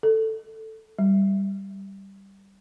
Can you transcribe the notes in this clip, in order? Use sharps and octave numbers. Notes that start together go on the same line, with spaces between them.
A4
G3